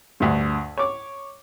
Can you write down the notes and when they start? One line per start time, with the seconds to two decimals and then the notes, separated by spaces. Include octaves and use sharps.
0.20 D2 G2
0.77 C#5 D6